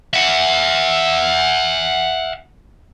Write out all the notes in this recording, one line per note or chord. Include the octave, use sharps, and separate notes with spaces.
E5 F#5